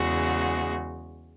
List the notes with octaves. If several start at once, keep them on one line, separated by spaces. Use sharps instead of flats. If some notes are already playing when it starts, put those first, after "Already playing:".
Already playing: E2 C#3 G#3 F#4